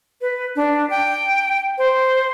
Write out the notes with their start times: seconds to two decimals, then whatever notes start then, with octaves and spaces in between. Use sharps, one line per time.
0.21 B4
0.56 D4
0.90 G5
1.78 C5